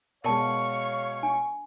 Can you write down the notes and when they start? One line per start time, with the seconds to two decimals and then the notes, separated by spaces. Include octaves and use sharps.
0.24 B2 G#3 A#4 C#5 D5 F5 A5 C#6
1.23 D4 G#5